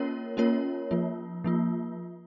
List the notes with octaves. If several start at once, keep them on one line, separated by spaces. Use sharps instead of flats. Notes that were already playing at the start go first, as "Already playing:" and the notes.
Already playing: A#3 C#4 F4 A#4 C#5
A#3 C#4 F4 A#4 C#5
F3 A#3 F4
F3 A#3 F4